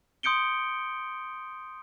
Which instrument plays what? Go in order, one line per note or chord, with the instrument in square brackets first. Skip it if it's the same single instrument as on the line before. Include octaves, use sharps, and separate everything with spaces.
[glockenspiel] C6 D#6 G6 C#7 D7 G7